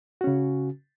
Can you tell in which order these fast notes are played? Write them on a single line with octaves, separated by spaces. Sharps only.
F#4 C#4 C#3